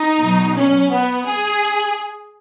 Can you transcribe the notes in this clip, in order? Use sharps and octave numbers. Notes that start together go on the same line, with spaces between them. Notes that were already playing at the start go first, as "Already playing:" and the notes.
Already playing: D#4
B2 F#3
C#4
B3
G#4